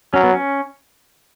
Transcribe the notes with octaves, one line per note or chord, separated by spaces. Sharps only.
F#3 C#4
B3
C#4